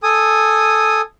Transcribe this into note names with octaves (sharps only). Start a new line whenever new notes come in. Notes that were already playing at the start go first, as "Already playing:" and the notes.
A4 G#5 D#6